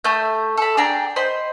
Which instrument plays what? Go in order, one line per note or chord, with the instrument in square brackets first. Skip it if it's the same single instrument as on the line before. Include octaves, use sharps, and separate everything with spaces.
[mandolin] A3 E5 D#6 G6
A4 B5
D4 G#4 G5 A#5
C5 D#5 B5